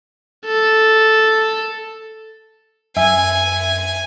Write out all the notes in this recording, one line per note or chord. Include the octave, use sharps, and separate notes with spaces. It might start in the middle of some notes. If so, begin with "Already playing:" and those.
A4
F#2 E5 G#5